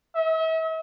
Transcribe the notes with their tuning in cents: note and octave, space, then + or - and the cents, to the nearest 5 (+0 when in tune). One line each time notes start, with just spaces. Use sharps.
E5 -45